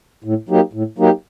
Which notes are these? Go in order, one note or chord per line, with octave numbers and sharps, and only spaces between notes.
A2
F#3 A#3 D#4 G4
A2
F#3 A#3 D#4 G4